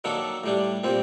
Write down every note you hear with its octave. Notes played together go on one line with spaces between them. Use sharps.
D#3 F#3 A#3 D4 A4
A2 G3 D4
A#2 G3 C4